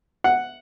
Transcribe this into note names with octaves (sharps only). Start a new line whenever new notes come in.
F#5